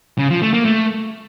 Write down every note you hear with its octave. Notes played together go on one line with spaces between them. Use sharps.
C#3
F3
A3
A#3
A3